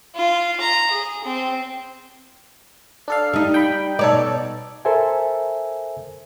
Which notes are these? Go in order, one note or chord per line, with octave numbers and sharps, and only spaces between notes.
F4
A#5
G#4
C4
D4 A4 F5
G3 D#4
G5 B5
B2 D#4 A4 C#5 D5
A4 A#4 C5 E5 G#5